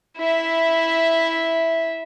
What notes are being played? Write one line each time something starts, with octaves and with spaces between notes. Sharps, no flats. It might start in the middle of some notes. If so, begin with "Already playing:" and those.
E4 E5